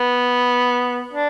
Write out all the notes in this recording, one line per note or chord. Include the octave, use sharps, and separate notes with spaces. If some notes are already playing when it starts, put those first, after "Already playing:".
Already playing: B3
D4